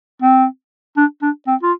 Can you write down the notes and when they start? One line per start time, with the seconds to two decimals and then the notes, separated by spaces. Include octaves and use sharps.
0.22 C4
0.97 D4
1.22 D4
1.47 C4
1.63 F4